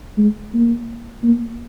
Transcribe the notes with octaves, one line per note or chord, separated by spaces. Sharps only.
G#3
A#3
A#3